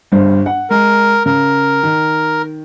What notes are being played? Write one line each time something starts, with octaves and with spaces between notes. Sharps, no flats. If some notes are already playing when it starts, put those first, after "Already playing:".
G1 G2 C5
F#5
G#3 A#4
C#3 A#4
D#3